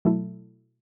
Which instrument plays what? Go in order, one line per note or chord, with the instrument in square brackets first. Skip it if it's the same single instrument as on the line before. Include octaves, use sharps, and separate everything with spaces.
[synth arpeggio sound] B2 F#3 A3 E4 A4